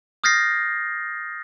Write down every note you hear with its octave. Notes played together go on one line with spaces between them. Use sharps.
D#6 F6 G6 A6 A#6 C7